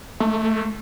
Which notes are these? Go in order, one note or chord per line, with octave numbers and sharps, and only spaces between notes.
A3